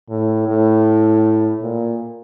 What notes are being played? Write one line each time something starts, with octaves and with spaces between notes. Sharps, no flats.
A2
A2
A#2